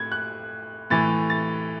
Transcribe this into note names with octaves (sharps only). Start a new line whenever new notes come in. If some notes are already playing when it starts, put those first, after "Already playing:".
Already playing: A2 G#6
F#6
A2 E3 A6
A6